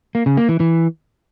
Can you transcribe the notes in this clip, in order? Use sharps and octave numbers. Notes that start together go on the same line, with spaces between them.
A#3
C#3
A#3
E3
E3